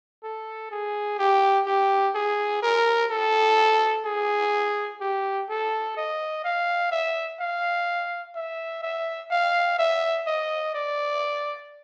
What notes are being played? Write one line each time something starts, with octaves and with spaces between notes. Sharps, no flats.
A4
G#4
G4
G4
G#4
A#4
A4
G#4
G4
A4
D#5
F5
E5
F5
E5
E5
F5
E5
D#5
D5